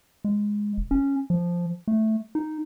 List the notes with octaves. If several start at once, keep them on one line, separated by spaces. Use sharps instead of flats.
G#3
E1
C#4
F3
A3
D#4